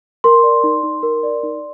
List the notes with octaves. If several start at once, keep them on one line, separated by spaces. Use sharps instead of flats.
A#4 C6
D5
D#4
D#4
A#4
D5
D#4